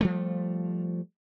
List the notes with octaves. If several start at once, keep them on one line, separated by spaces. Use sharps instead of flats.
F3 G3 A3